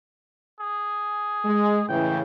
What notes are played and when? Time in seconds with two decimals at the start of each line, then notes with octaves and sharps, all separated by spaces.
0.60 G#4
1.45 G#3
1.89 A2 C#3 E3 G5